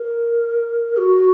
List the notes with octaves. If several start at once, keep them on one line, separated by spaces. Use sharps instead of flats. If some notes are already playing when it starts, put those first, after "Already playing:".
Already playing: A#4
F#4